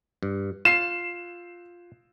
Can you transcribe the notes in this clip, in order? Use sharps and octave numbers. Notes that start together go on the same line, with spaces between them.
G2
F4 C7 E7